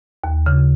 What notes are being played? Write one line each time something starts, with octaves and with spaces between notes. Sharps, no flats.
D#2
C#3